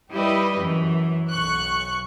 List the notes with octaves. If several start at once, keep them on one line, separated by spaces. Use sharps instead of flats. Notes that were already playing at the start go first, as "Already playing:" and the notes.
G3 E4 G4 B4 D#5
F#2 E3
B1 C#6 F#6